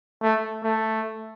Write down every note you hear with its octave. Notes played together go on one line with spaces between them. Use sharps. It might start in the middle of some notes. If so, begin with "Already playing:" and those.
A3
A3